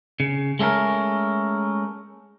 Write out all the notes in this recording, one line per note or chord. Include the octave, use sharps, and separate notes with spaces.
C#3
G#3 A3 C#4 E4 A#4